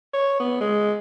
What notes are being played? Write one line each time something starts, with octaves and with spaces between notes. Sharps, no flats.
C#5
B3
G#3